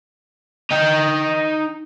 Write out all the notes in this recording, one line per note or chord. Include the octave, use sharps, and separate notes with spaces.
D#4 G5